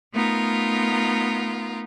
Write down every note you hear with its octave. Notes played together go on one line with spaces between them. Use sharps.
A3 B3 D#4 F4 A#4